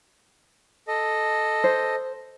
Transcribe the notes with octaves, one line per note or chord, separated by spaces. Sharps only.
A4 D#5
C5